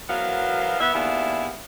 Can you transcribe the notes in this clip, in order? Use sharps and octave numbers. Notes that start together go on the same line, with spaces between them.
E2 F#3 B3 A#4 C5 F5
B3 E5
D#2 B3 D4 E4 G#4 F5